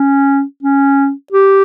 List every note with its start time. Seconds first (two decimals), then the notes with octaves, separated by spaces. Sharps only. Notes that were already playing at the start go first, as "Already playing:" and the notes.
Already playing: C#4
0.63 C#4
1.32 G4